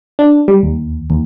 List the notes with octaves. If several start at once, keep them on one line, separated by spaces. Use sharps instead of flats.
D4
G3
D#2
D#2